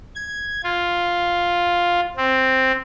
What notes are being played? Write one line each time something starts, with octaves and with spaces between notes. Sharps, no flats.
G#6
F4
C4